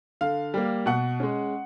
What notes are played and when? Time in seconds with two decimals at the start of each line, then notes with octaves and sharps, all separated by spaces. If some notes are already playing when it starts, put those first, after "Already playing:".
0.21 D3 F5
0.54 G3 A#3
0.86 B2 F#5
1.20 G#3 C#4